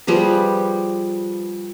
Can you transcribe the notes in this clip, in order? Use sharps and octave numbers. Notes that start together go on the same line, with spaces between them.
F3 G3 G#4 B4